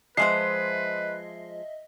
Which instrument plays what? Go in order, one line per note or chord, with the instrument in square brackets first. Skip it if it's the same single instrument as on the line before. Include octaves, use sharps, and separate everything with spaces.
[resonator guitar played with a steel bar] F3 G#3 C5 [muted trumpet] B4 [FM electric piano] D#5 E5 [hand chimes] C7